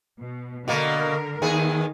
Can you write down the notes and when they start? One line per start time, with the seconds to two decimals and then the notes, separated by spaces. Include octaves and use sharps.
0.21 B2
0.68 B2 D3 A#3 A#4
1.42 D#2 D#3 B3 G#4